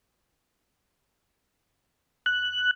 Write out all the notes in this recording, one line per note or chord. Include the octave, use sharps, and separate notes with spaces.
F#6